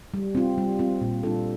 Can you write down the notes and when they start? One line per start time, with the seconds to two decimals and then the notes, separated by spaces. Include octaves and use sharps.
0.14 G3
0.35 C4 F4
0.58 G3
0.79 C4 F4
1.01 A#2
1.23 G3 D4 F4 A4